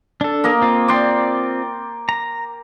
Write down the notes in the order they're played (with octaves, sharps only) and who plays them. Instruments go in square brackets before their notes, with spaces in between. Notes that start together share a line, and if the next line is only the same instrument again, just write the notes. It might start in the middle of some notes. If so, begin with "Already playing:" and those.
[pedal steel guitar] D4 A4
[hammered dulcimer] A#3 A#4 D#5
[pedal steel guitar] C4 F4
[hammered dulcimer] D5 G5 C6
[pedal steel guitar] A#5